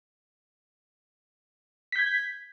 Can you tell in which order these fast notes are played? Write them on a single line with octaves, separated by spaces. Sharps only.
B6 G6 G#6